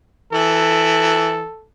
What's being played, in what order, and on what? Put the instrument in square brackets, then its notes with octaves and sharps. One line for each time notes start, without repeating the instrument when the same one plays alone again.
[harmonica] E3 [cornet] A4